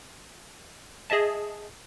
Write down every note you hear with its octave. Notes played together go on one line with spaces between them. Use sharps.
G#4 D#5 E5 A5